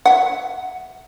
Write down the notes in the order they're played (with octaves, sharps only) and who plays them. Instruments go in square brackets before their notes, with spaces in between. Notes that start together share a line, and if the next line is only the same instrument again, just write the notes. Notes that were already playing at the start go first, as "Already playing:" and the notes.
[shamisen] E5 F#5